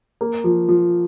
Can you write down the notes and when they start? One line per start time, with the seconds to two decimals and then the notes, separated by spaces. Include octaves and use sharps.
0.21 A#3
0.44 F3
0.68 F3